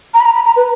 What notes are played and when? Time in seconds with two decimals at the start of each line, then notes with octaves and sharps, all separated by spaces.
0.14 A#5
0.20 B5
0.25 A#5
0.35 B5
0.46 A#5
0.56 B4